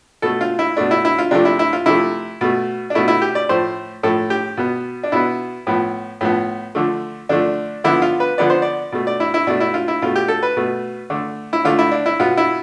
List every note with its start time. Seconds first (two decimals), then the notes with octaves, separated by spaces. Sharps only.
0.22 B2 A3 A4
0.41 F4
0.59 E4
0.77 B2 A3 D4
0.91 E4
1.05 E4
1.18 F4
1.31 C3 F3 A3 D4
1.45 E4
1.59 E4
1.73 F4
1.86 C3 F3 A3 E4
2.41 B2 A3
2.90 D4
2.95 B2 A3 E4
3.08 E4
3.22 G4
3.35 D5
3.49 A2 F3 A3 C5
4.03 A2 F3 A3 A4
4.30 G4
4.57 B2 B3
5.03 D4
5.12 B2 B3 E4
5.67 A2 F3 B3
6.21 A2 F3 B3
6.75 D3 F3 A3
7.29 D3 F3 A3 D4
7.84 D3 F3 B3 E4
8.02 F4
8.20 B4
8.38 D3 F3 B3 D5
8.50 C5
8.62 D5
8.92 B2 A3
9.07 D5
9.20 E4
9.34 E4
9.47 B2 A3 D4
9.60 E4
9.74 F4
9.88 E4
10.02 B2 A3 F4
10.16 G4
10.28 A4
10.43 B4
10.57 B2 A3
11.10 D3 A3
11.53 E4
11.65 D3 A3 F4
11.79 E4
11.91 D4
12.06 E4
12.20 B2 B3 F4
12.37 E4